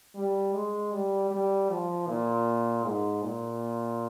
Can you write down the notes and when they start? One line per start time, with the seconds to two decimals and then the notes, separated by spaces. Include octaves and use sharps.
0.15 G3
0.53 G#3
0.92 G3
1.31 G3
1.69 F3
2.07 A#2
2.85 G#2
3.23 A#2